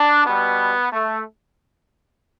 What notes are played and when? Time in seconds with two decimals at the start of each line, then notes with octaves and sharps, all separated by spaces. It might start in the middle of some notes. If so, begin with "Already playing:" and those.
Already playing: D4
0.25 B2 G3 B3
0.92 A3